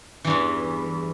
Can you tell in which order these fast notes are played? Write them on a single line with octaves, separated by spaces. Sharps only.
E3 G2 E2